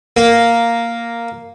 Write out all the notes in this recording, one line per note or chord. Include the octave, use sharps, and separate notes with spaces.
A#3